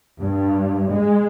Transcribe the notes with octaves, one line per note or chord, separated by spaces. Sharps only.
G2
G#3